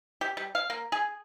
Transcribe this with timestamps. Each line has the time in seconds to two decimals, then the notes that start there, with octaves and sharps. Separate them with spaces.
0.21 G4
0.37 G3
0.55 F5
0.70 A#3
0.92 G#4